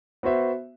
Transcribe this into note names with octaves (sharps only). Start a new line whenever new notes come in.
B3 F#4 C5 E5